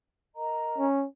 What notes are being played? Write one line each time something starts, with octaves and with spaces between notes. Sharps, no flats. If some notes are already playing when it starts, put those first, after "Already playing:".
A#4 D#5 A#5
C#4